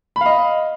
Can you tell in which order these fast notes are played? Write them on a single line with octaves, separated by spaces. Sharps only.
B5 F5 D#5